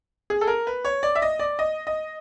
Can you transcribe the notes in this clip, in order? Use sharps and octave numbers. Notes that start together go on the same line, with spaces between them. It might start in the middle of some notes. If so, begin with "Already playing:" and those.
G#4
A4
A#4
B4
C#5
D5
E5
D#5
D5
D#5
D#5